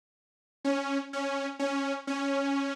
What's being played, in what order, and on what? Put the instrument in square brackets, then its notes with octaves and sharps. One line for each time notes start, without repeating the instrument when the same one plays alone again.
[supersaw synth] C#4
C#4
C#4
C#4